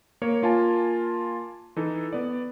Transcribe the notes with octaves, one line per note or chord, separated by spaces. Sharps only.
A#3 C#5
A#3 F4 G#5 A5
E3 D#4 A4
B3 D5